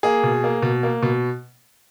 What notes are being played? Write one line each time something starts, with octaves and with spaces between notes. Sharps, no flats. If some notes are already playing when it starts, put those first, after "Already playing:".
A#3 G#4
B2
A#3
B2
A#3
B2